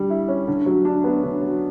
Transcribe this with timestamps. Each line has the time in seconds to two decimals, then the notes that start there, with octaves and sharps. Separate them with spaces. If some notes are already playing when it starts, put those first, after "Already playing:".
Already playing: D3 G3
0.10 E4
0.28 C#4
0.47 D3
0.66 F#3
0.85 D4
1.04 B3
1.23 D3
1.42 F#3